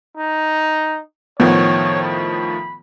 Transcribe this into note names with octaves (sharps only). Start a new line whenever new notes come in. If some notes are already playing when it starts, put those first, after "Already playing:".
D#4
A2 D#3 F3 B3 C#5
B5